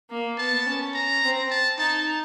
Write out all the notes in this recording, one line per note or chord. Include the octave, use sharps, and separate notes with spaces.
A#3
B3 A5
C#4
A#5
C4
A5
D#4 A5